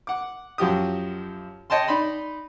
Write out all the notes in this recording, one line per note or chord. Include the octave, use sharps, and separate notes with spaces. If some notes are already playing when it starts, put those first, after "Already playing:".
F#5 D6
F#2 F3 F#4 G4 D#6
C#5 D#5 G5 A5 C6
D#4 D5 B5 C6